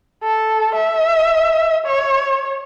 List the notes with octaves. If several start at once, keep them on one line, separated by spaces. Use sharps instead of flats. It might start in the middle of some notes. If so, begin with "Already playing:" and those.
A4
E5
C#5